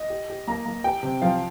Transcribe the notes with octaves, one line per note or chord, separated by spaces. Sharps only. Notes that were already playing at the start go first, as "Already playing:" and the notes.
Already playing: D#5
G4
G4
A#3 A#5
A#3
G4 G5
C3
F3 F5